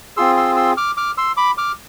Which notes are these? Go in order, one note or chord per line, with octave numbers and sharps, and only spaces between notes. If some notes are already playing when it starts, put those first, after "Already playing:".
C4 F4 G#4 C6 E6
C6 E6
C6 E6
D6 F6
D6 F6
C6 E6
B5 D6
D6 F6